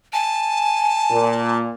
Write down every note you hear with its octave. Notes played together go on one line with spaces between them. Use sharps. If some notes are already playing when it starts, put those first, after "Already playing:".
G#5 A5
A#2